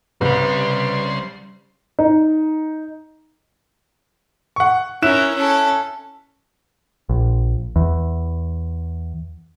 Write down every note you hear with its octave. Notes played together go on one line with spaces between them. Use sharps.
C2 C#3 G3 B4 C5 B5 C6
D#4
F#5 C#6
C#4 E4 A#4 F#6 E7
C#4 A4
A#1
E2